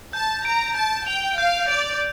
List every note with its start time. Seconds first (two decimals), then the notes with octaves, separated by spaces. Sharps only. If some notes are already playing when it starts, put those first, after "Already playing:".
0.13 A5 G6
0.44 A#5 D7
0.75 A5 G6
1.06 G5 F7
1.37 F5 G6
1.68 D5 D7